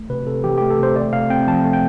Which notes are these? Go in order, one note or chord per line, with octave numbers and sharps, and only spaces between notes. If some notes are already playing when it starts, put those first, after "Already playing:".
Already playing: A3
C3 B4
C3 A4
E3 G4
G4
A3
A4
C3 C5
A3 D5
C3 F5
C4 G5
F3 A5
A3
G5